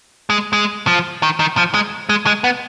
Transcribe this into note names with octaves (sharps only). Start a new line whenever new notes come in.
G#3
G#3
F3
D#3
D#3
F3
G#3
G#3
G#3
B3